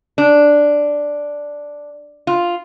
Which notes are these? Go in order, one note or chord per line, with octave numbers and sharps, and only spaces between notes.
D4
F4